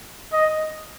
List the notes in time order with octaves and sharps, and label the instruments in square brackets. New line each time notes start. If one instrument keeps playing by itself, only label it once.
[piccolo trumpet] D#5